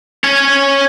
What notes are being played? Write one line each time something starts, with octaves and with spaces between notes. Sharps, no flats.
C#4 C#5